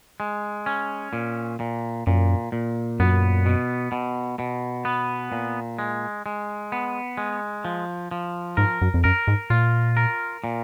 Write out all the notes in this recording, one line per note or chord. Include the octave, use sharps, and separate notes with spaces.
G#3
C#4
A#2
A#2
F#2 A#2
A#2
F#2 B3
B2
B2
B2
B3
A#2
G#3
G#3
B3
G#3
F3
F3
G#2 A#4
F#2
F2
F#2 A#4
G#2
A#2 F4
A#4
A#2